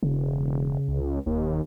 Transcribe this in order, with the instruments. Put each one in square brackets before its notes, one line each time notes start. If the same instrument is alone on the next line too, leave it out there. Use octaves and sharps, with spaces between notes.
[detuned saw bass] E1 [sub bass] C#3
[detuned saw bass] C#2
[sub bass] E1 [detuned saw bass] D#2